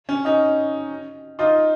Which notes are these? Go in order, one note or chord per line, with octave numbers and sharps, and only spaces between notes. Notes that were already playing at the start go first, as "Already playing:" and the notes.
C#4
C#4 D#4
D#4 F4